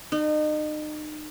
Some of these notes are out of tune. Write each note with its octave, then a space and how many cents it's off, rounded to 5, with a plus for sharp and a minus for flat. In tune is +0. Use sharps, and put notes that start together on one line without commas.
D#4 -35